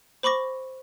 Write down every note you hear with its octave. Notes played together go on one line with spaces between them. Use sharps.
C5 B5 C#6 D6 A#6